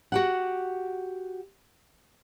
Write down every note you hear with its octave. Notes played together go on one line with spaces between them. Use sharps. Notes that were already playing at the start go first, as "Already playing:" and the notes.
F#4 G4 F#5